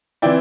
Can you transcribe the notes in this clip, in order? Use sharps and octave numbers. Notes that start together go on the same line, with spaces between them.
E3 C4 E4 D5 G5